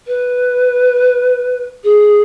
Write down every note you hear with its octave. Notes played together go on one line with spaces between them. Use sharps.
B4
G#4